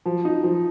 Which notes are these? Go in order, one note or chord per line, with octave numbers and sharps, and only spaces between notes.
F3
D#4
F3